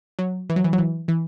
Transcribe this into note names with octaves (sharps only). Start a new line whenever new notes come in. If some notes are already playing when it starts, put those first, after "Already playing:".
F#3
E3
F#3
E3
F#3
E3
E3